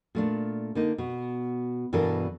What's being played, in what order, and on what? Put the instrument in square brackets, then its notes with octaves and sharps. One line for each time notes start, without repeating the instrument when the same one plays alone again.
[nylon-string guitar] A#2 A3 D4
D3 A#3 D#4
B2
G2 B2 E3 D4 A4 A#4